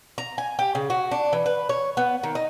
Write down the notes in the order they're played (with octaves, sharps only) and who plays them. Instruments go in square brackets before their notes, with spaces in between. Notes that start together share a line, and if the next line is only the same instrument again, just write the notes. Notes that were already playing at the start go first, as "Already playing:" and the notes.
[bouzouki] A#5
G#5
G4
C#3
F#4
D4
E3
B4
C#5
B3
D#3
D#4